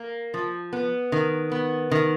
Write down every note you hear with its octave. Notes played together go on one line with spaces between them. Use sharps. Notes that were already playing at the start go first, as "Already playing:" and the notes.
Already playing: A#3
F3
B3
D#3
B3
D#3